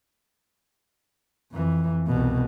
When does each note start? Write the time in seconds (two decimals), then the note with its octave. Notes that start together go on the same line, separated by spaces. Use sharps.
1.52 F2 E3
2.07 C2 B2